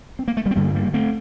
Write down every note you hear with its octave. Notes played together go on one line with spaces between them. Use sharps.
C4
A#3
A3
G3 A#3
C4
G2 D3 G3 A#3
G3 A#3
A3 C4